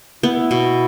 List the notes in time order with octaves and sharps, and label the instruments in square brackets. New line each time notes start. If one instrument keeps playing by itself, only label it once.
[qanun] B3 [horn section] E4
[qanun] B2